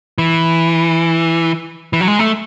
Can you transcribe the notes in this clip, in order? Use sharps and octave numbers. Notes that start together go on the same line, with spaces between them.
E3
E3
F#3
G#3
A3